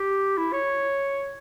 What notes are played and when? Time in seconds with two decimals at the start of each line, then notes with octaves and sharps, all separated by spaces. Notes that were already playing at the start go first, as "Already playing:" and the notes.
Already playing: G4
0.38 E4
0.53 C#5